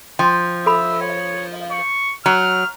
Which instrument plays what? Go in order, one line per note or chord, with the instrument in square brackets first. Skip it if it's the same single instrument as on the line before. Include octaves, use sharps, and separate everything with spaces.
[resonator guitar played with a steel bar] F3 [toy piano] G5
[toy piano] A4 B5 [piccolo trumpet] E5
[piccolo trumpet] C#5
C#6
[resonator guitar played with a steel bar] F#3 [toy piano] A#5 [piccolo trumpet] F6